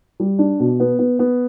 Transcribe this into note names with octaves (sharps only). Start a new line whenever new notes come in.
G3
D4
B2
B3
B3
B3